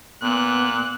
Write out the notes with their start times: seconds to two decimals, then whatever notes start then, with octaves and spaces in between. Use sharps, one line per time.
0.23 A#2 B3 F#6